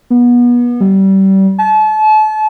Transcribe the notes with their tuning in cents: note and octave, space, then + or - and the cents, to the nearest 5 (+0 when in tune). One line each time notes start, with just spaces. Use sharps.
B3 -30
G3 -30
A5 -35